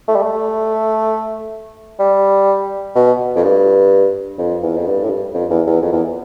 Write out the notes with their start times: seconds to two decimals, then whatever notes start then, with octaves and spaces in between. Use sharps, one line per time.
0.08 A3
0.16 G3
0.22 A3
2.00 G3
2.95 B2
3.36 F2
3.43 G2
4.39 F2
4.63 E2
4.76 F2
4.87 G2
5.04 A2
5.10 G2
5.34 F2
5.50 E2
5.67 E2
5.82 F2
5.93 E2